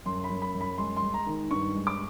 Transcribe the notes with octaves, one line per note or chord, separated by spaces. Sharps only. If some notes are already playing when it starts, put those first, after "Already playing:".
F#2 C6
B5
F#2
B5
F#2
B5
G#3 C6
C6
G#3
A#5
D#3
G2 C#6
G#3
D6